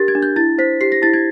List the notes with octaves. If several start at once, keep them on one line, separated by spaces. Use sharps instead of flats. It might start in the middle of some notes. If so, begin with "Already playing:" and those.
Already playing: D4 G4 A#4 A6
G#6
D4
G6
E4 A6
C5 B6
G4 C7
A#6
E4 A6
G#6